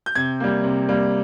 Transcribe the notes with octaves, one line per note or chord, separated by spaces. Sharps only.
G6
C3 G#6
G3 A#3
C3
G3 A#3